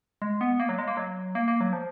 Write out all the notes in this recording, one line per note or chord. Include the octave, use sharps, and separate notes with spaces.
G#3
B3
A#3
F#3
G#3
A#3
F#3
A#3
A#3
F#3
F3